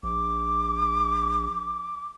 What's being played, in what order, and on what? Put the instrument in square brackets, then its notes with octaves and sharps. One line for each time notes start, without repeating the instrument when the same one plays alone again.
[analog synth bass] A#1 [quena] D6